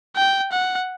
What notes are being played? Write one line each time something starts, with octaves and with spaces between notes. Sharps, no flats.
G5
F#5